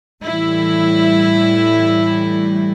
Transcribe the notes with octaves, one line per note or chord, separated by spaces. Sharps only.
A2 E3 G3 E4